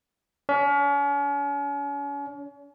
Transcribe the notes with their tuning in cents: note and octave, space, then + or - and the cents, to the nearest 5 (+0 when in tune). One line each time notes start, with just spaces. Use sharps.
C#4 +40